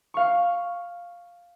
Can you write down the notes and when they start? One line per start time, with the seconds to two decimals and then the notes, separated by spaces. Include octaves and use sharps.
0.14 F5 C#6